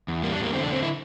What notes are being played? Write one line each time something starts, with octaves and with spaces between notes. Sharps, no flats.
E2
G3 A#3
D4
E2 A#3
D3 C4
D4
D3 C4
E4